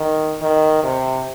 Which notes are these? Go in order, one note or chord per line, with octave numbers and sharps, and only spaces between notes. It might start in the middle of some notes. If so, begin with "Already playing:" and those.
Already playing: D#3
D#3
C3